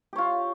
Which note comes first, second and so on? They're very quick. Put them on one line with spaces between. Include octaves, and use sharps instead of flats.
G4 C#5 F4